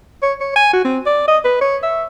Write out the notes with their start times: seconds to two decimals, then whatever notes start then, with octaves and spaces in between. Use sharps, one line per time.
0.22 C#5
0.41 C#5
0.56 G#5
0.73 F#4
0.85 C4
1.06 D5
1.28 D#5
1.45 B4
1.61 C#5
1.83 E5